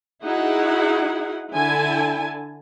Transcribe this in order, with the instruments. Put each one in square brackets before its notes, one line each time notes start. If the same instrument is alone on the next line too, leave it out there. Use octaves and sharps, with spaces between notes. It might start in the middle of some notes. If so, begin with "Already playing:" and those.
[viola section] D#4 E4 F#4 G#4 F#5
D3 E4 G#5 A5